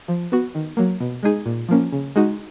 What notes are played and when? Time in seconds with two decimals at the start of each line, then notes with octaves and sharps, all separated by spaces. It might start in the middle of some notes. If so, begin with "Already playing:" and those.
0.08 F3
0.32 B3 F#4
0.55 D#3
0.77 F#3 A#3
1.00 B2
1.23 G#3 D#4 G#4
1.46 A#2
1.69 F3 A#3 C#4
1.92 C#3
2.16 G#3 D#4 F#4